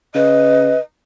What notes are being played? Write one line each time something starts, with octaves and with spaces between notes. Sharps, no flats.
C#3 B4 D#5